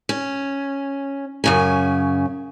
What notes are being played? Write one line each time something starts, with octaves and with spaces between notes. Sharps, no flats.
C#4
F#2 C#3 G#5